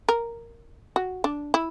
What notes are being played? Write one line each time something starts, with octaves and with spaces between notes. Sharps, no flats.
A#4
F#4
D4
E4